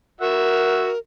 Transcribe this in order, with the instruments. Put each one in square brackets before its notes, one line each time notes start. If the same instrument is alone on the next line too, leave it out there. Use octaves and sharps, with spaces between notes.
[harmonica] F#4 E5 F#5 [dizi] A#4